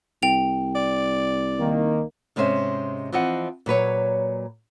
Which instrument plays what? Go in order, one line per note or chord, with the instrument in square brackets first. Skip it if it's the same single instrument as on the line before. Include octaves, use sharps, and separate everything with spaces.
[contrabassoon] C2 [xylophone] G5 F7
[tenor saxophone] D5
[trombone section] D#3 A#3
[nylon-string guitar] G#2 C3 G#3 C#4 C5 E5
E3 F3 C4 D#5 F#5
A#2 F#3 B4 C#5